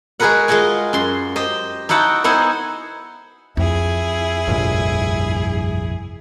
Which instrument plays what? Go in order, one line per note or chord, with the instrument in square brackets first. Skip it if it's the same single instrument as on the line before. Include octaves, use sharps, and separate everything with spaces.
[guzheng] G#3 F#4 G#4 A#4 B4 F#5
G#3 F4 D#5 F#5 G#5
F#2 C6
G4 C5 D#5
D#4 E4 F#4 F#5 G5 A5
B3 D#4 E4 C5 F#5 G#5
[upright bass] F2 [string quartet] E4 G#4
[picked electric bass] F1 A#1 [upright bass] G2